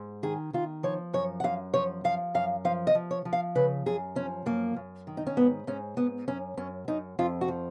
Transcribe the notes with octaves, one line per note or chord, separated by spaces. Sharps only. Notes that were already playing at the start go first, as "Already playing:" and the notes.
Already playing: G#2
D#3 G#4
D#3 F4
F3 C#5
F#2 C#5
F#5
F#2 F5
F3 C#5
F3 F5
F#2 F5
F3 F5
D#5
F3
C#5
F3
F5
C#3 B4
F#2 G#4
F3 C#4
F#2 A#3
F#2
D#3
D#4
C#4
G#2 B3
G#2 C#4
G#2 B3
F#2 C#4
F#2 C#4
F#2 D#4
F2 F4
F#4
F3